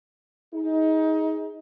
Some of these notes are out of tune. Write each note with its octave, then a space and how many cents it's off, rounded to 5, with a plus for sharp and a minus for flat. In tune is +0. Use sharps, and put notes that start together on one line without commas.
D#4 +25 G#4 +0